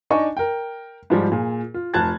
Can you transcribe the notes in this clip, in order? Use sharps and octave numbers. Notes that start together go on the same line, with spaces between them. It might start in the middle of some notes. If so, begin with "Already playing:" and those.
D4 D#4 D#5 G#5 C#6
A#4 G5
G#2 F3 G3
A#2 G#4
F4
F1 F3 A5 F#6 G#6 A6